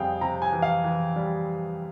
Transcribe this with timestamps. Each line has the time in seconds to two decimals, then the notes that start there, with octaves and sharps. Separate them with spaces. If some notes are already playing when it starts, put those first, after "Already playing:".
Already playing: F2 G3 G#4 F5 G5
0.21 C3 A#5
0.42 G#5
0.53 E3
0.62 F5
0.84 E3
1.16 G3